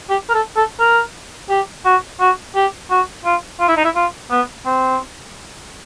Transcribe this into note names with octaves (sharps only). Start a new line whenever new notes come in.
G4
A#4
A4
A4
A#4
G4
F#4
F#4
G4
F#4
F4
F4
E4
D#4
E4
F4
B3
C4